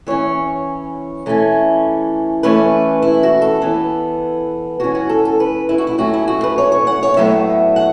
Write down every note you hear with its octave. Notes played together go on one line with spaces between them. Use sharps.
E3 C#4 C#5
E3 A3 C#4
E3 A3 C#4 B4
E4
F#4
A4
E3 B3
E3 C#4 F#4
F#4
A4
A4
B4
E4
F#4
E4
A2 F#3 A3 C#4 F#4
E4
F#4
B4
C#5
C#5
F#5
C#5
A2 F#3 B3 E5
F#5